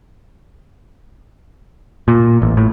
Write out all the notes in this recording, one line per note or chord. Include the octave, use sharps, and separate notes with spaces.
A#2
A1
A2